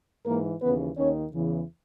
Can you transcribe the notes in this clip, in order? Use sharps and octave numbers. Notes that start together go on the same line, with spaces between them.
G#2 E3 A#3 A#4
D#2 C#3 E3 B3 B4
D#2 D#3 C#4 C#5
E2 C#3 E3